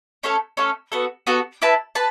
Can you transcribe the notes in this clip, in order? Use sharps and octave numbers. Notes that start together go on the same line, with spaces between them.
A3 C#4 A4 C#5
A3 C#4 A4 C#5
B3 F#4 A4
B3 F#4 A4
E4 B4 E5 A5
B4 A5